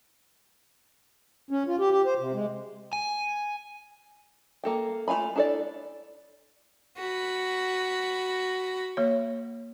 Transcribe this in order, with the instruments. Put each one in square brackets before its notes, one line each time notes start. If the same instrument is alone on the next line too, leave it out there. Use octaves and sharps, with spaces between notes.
[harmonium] C#4
F4
G4
G4
C5
C3
G#3
[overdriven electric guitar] G#5
[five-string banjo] A#3 A4 G5
A3 F4 F5 G#5 B5
D4 E4 A4 C5 D5
[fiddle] F#4 B5
[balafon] A#3 C#5